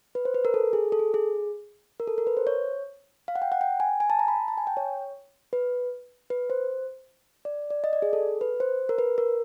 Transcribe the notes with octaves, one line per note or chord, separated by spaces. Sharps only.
B4
C5
B4
A#4
A4
G#4
A4
G#4
G#4
A#4
A4
A#4
B4
C5
C#5
F5
F#5
G5
F#5
G5
G#5
G#5
A5
A#5
B5
A5
G#5
G5
C#5
B4
B4
C5
D5
D5
D#5
D5
G#4
A4
B4
C5
A#4
B4
A#4